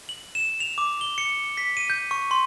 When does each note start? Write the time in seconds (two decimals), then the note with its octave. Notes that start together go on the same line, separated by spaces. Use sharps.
0.09 F#7
0.35 E7
0.60 F7
0.78 D6
1.01 G7
1.18 C#7
1.57 B6
1.77 D#7
1.90 G6
2.11 C#6
2.31 C6